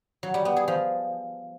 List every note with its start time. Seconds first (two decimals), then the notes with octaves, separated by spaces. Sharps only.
0.23 F#3
0.34 G3
0.45 B3
0.56 G#4
0.68 F3